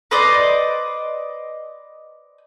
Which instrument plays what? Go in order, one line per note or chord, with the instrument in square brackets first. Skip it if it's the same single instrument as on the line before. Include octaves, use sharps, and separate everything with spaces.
[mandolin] B4 C5 D5 D#5